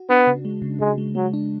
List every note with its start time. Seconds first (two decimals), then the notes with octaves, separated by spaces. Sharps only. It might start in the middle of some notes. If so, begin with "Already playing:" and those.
Already playing: F#4
0.09 B3 D4
0.27 C#3
0.45 G#3
0.62 C#3
0.80 C#3 G#3
0.98 G#3
1.15 F#3 G#3
1.34 D4